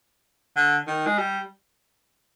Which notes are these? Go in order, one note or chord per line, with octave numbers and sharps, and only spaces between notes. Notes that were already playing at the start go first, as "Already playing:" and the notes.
D3
D#3
G#3
G3